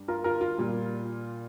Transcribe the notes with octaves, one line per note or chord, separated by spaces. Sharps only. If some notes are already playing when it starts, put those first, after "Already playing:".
Already playing: G2 G3
F4 A#4
F4 A#4
F4
A#2 G3